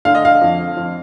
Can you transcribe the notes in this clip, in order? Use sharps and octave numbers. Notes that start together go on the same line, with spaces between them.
D3 F5
D#5
F5
F2
F2